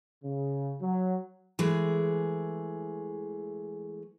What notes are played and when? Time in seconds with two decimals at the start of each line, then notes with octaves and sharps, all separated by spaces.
0.24 C#3
0.81 F#3
1.59 E3 G#3 A3 G#4